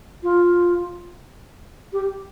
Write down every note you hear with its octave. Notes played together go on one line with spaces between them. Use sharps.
F4
G4